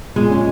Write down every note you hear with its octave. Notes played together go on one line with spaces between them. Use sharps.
A#2 G#3
C#4